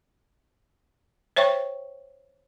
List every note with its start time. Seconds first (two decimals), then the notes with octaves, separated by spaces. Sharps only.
1.36 C5 C#5 E5 G5 C#6